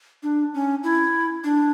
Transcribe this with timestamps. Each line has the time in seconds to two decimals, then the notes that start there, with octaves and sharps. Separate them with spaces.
0.23 D4
0.54 C#4
0.83 E4
1.44 D4